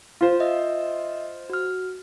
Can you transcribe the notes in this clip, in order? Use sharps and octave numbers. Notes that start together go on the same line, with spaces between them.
F4 C5 F5
D#5 E5
F#4 F6